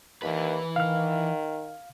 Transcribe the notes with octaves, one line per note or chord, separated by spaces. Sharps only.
D#2 E3 B4
D#3 F5 F6